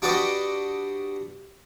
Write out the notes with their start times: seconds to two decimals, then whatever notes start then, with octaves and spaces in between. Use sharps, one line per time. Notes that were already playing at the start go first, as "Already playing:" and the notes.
0.02 D4 F#4 G4 B4 D5 D#5